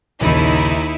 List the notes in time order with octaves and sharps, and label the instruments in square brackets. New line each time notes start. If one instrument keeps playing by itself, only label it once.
[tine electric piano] A#1 C#3 [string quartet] D#2 [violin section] D#4 E4